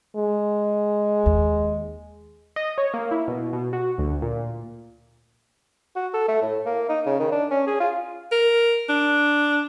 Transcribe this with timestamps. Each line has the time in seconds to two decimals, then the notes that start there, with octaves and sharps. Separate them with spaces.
0.16 G#3
1.26 D#2
2.56 D#5
2.78 C#5
2.94 A#3
3.11 E4
3.28 B2
3.53 B2
3.73 F#4
3.98 D2
4.22 A#2
5.96 F#4
6.14 A4
6.28 A3
6.42 A2
6.66 A#3
6.89 D#4
7.06 C#3
7.20 D#3
7.32 D4
7.51 C#4
7.67 G#4
7.80 F4
8.32 A#4
8.89 D4